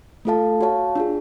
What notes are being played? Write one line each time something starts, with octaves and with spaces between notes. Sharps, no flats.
A3 F4 A4 F5 A5
F#4 C#5 F5 A5
D4 F4 G#4